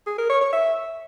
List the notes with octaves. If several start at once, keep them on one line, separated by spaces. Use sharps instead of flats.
G#4
A#4
C#5
C#5
E5